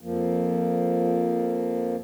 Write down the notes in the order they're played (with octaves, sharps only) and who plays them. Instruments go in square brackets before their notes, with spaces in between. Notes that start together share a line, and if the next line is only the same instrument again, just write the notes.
[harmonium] F2 F3 A#3